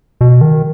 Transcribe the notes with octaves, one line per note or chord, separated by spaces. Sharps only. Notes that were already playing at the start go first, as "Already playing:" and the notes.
B2
D#3